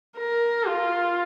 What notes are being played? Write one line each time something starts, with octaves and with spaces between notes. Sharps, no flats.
A#4
F4